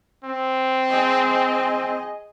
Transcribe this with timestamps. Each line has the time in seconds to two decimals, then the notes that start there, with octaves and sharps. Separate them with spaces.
0.24 C4
0.89 G#4 D#5